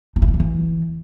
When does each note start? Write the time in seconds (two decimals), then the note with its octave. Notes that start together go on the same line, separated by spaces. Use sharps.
0.16 D#4
0.22 E4
0.28 D#4
0.34 F3
0.40 E3